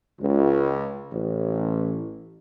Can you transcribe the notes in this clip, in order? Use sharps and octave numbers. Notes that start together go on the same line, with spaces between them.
C#2
A1